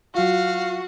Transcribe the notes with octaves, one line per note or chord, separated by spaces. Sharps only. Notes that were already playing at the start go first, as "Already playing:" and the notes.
F#3 F4 F#4 F5